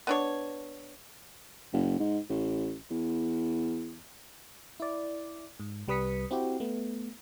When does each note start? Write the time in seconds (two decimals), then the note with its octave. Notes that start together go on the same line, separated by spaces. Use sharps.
0.07 B3 D4 C#5
1.73 F#1
1.99 G#2
2.30 A1
2.91 E2
4.80 E4 D5
5.60 G#2
5.88 C2 G3 B4 D#6 B6 C#7
6.31 C4 E4 F#4 G4
6.60 A3 B3